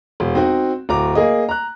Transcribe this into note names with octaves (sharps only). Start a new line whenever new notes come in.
E1
C4 D#4 F#4
D1 A#5 D6
A#3 G#4 D#5
A#5 F#6